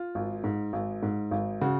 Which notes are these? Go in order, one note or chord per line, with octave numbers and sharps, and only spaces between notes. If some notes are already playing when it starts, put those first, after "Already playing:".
Already playing: F4
G#1
G#2
G#1
G#2
G#1
C#3 F#4